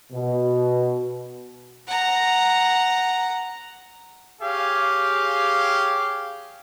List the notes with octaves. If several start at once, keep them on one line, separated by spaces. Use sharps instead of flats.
B2
F#5 A#5
G4 G#4 C#5 F5